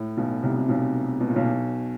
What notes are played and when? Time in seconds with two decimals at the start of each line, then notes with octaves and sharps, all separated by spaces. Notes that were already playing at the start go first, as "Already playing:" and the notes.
Already playing: A2
0.17 B1 B2
0.43 C2 C3
0.58 C3
0.69 B1 B2
1.21 B2
1.29 A#2
1.36 B1 B2